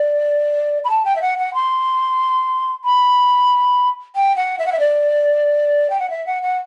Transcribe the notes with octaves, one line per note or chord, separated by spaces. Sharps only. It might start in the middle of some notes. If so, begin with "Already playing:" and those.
Already playing: D5
B5
A5
G5
E5
F#5
F#5
C6
B5
G5
F#5
E5
F#5
E5
D5
G5
F#5
E5
F#5
F#5